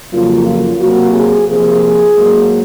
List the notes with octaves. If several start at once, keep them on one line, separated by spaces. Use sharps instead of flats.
F2 C#3 F#3 A#3 F4
F4
C3 F#3 A#3 F#4
G#4
C3 F3 A#3 G#4
G#2 F#3 A#3